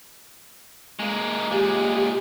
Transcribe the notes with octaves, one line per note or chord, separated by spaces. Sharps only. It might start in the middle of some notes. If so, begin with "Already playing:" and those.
G#3 A#3
A#2 G#3 G4